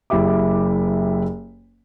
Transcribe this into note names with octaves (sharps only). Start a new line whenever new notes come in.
F#1 E4 G4 E5 D6